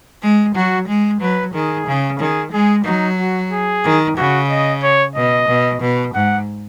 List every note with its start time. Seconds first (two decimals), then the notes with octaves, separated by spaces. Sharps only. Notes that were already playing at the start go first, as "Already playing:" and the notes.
0.23 G#3
0.55 F#3 F#4
0.88 G#3
1.21 F#3 B4
1.54 D#3 G#4
1.87 C#3
2.20 D#3 G#4
2.52 G#3 G#4
2.85 F#3 D#4
3.19 F#4
3.52 G#4
3.84 D#3
4.17 C#3 F#4
4.50 D#5
4.83 C#5
5.15 B2 D#5
5.49 B2
5.81 B2
6.15 G#2 F#5